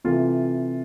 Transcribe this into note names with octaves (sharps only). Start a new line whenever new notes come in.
C3 E3 A3 F4